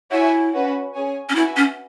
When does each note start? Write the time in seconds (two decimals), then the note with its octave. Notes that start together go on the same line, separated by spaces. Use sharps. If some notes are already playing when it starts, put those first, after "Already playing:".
0.11 E4 F#4 C#5 E5 G#5
0.53 C#4 F#4 B4
0.94 C#4 G#4 C#5 G#5
1.29 C#4
1.35 E4 F#4 B4 E5 G#5
1.57 C#4